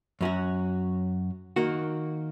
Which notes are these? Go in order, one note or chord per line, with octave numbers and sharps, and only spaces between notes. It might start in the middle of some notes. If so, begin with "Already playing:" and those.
F#2 F#3 C#4 F#4
D#3 A#3 F#4